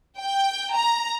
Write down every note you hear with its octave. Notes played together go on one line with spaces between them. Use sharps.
G5
A#5